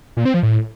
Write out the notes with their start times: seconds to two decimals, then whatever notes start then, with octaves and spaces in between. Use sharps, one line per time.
0.17 A#2
0.25 C4
0.34 F3
0.43 A2